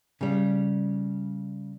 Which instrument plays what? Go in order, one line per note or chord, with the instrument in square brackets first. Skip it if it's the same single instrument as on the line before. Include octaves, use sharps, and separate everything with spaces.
[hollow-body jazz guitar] C#3 G3